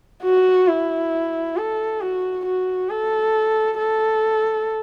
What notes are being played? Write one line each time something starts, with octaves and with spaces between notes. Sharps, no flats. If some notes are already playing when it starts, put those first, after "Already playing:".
F#4
E4
A4
F#4
F#4
A4
A4